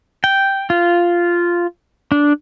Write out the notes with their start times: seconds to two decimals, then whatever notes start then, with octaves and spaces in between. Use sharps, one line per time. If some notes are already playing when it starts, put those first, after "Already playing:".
0.24 G5
0.70 F4
2.12 D4